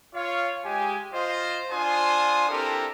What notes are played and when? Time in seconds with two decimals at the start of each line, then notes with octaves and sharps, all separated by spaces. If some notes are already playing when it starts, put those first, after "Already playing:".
0.15 F4 C#5 F5
0.66 G#3 G4 G#5
1.14 F4 C5 D#5
1.72 D4 F4 C5 G#5 C6 D#6
2.49 C4 D4 E4 G4 A4 A#4